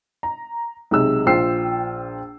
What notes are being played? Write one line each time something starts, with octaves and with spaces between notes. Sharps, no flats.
A#5
B1 C3 G#3 E6
A#1 F4 C5 G5 E6 C7